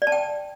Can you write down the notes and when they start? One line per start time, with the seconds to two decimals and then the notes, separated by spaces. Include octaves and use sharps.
0.02 D5
0.07 A5
0.12 G5